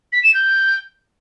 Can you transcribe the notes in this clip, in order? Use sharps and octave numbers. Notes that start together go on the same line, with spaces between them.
B6
E7
G6